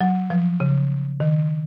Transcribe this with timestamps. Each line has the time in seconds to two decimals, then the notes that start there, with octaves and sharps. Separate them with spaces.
0.01 F#3
0.30 F3
0.60 C#3
1.20 D#3